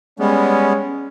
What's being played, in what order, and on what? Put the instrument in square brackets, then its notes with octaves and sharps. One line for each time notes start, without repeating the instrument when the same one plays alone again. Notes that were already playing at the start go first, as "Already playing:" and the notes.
[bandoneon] G3 B3 [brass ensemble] G#3 C#4